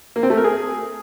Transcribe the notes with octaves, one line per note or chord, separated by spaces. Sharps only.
A#3
C4
A3
A#4
G#4